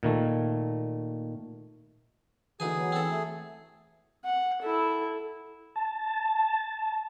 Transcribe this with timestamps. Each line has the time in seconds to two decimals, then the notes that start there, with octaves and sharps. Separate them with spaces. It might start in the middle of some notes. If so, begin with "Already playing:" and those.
0.03 A#2 D#3 A3
2.60 D2 E3 D#4 G#4 G#5
2.76 F#3 B3
2.92 C4 A4
3.10 A3
4.24 F#5
4.62 E4 A4
5.76 A5